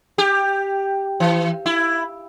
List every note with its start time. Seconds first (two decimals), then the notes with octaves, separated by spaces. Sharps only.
0.18 G4
1.20 E3
1.66 E4